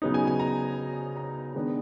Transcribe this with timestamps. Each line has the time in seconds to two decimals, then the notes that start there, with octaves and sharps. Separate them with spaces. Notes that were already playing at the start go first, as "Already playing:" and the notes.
0.02 C#3 F#3 B3 D#4
0.14 G#5
0.27 G#5
0.40 A#5
1.17 A#5
1.55 D#3 G#3 B3 D4